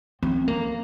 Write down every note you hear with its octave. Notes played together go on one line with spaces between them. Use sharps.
C4
A#3